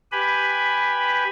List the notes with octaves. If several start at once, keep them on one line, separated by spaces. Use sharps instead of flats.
G4 B4 G#5 B5